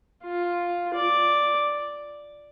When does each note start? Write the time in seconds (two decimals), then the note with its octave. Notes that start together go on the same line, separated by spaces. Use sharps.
0.24 F4
0.94 D5